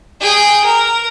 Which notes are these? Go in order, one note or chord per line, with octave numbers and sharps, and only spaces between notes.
G#4 G5
A#4